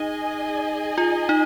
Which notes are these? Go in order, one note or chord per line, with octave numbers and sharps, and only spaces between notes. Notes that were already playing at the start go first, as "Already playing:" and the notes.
Already playing: D#4 G#4 D#5 G#5
F4
D#4